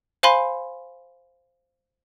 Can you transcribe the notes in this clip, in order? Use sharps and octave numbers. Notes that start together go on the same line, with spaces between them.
C5 F5 G#5 B5 C6